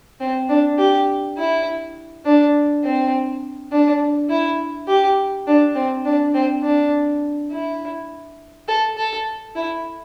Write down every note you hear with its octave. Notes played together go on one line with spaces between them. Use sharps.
C4
D4
G4
E4
D4
C4
D4
E4
G4
D4
C4
D4
C4
D4
E4
A4
A4
E4